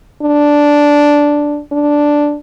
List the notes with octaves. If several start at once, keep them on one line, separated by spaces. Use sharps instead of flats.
D4
D4